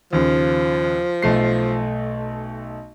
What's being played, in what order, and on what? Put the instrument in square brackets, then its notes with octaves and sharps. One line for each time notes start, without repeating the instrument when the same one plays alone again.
[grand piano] D#2 C#3 [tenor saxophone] F3
[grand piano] B1 A3 C7